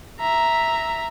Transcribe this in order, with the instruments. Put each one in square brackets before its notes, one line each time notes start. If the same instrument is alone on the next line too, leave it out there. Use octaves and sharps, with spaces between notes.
[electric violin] E5 A#5